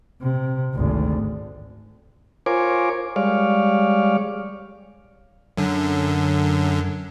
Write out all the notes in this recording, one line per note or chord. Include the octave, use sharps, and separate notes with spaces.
C3
G#1 D2
F4 A#4 C5 C#5 G#5 D6
G3 G#3 C#5 D5 F5
F#2 D3